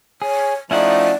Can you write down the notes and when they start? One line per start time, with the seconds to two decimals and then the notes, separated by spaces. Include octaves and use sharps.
0.22 G#4 C#5
0.71 F3 A3 C#4 D#4 E4 D5 F#5